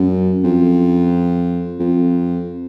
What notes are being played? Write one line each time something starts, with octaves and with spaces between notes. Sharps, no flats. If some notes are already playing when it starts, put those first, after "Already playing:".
Already playing: F#2
F2
F2